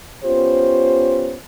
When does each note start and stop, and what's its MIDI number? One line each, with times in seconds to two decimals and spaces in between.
0.23 1.35 59
0.23 1.35 61
0.23 1.35 65
0.23 1.35 67
0.23 1.35 72